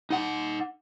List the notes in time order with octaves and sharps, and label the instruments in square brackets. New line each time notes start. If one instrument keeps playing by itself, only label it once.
[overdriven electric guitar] D#4 F#5